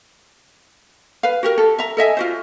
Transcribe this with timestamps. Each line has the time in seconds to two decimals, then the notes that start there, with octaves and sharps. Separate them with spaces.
1.23 B4 F5
1.43 F#4 G4 A#4
1.58 A4
1.79 E5 A#5
1.97 A4 D#5 E5 G#5
2.17 F4 F#4 C5